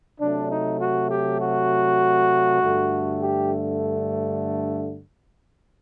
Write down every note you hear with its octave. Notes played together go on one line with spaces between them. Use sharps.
C3 F#3 A3 D4
D#4
F#4
G4
F#4
G2 D3 A3
G4